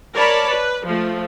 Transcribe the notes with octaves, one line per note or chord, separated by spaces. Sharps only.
A#4 C#5 D5 A5 B5
B4
F3 A3